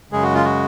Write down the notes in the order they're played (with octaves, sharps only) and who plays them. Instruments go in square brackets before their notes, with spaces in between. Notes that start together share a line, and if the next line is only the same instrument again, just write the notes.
[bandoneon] F#2 C#3 G#3 G#4
F#4
F4
F#4